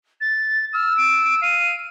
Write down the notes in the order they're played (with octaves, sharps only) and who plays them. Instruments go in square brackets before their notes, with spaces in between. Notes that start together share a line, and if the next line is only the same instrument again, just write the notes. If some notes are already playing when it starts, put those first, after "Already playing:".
[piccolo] A6
[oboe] E6 [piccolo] F6
[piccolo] D7
[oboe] F5 [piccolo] D#7